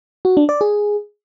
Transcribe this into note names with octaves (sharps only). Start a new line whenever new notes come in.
F#4
D4
D5
G#4